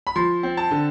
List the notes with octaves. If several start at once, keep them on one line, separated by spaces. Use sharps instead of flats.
B5
F3 C6
C4
A5
D3